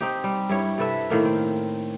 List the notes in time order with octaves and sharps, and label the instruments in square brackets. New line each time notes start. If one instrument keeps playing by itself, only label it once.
[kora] C4 D#4 G4
G3
G2 E4 C#5
C3 A4 B4 E5
A2 D#3 A#3
C4